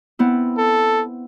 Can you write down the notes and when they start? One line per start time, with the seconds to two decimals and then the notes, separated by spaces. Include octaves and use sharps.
0.19 B3 C4 E4
0.58 A4